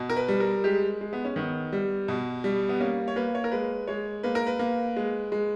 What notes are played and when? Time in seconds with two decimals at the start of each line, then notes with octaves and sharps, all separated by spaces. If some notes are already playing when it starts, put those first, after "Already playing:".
Already playing: B2
0.10 A#4
0.17 B4
0.28 G3
0.40 A#4
0.64 G#3 G4
1.01 G#3
1.13 B3
1.25 C#4
1.36 D#3 B3
1.73 G3
2.08 B2
2.44 G3
2.69 B3
2.80 A#3 C#4
3.08 C#5
3.16 A#3 B4
3.35 C#5
3.44 A#4
3.52 G#3 B4
3.87 G#3 C#5
4.23 A#3 B4
4.35 A#4
4.47 B4
4.59 A#3
4.97 G#3
5.32 G#3